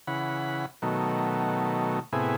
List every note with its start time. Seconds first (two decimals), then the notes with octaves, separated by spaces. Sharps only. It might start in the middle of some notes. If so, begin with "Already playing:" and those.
0.07 C#3 E3 F#5 B5
0.82 B2 D#3 F#3 A3
2.13 A2 C3 B3 E4 G#4